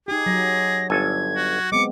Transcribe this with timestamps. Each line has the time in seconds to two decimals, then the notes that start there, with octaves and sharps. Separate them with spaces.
0.08 D#4 G4 G#4
0.26 F#3 A#6
0.90 G1 A4 G#5 G#6
1.36 F#4
1.72 G#3 B3 C4 D6 C#7